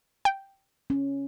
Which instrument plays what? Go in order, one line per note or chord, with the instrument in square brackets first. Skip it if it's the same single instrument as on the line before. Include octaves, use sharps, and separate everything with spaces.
[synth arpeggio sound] G5
[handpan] C#4